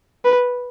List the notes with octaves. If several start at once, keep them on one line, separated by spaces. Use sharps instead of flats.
B4